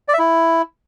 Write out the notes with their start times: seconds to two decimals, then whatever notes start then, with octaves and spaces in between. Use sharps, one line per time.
0.08 D5
0.14 E5
0.19 E4